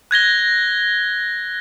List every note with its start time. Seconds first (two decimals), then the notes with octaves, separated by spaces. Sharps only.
0.11 F#6 G#6 A#6 G7